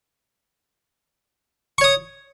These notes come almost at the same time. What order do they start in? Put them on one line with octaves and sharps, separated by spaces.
C#6 C#5 D#6